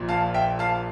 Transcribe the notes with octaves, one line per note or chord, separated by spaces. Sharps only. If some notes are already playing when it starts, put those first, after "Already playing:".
Already playing: A#1 A#2 F3
F5 A5
E5 G5
F5 A5